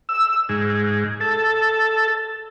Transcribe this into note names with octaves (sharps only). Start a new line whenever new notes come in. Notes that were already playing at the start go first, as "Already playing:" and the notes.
E6
G#2
A4